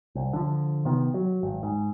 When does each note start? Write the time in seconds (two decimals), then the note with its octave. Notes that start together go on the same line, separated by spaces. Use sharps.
0.15 C2
0.33 D3 F3
0.85 C3 D#3 B3
1.14 F#3
1.43 G#1
1.63 G#2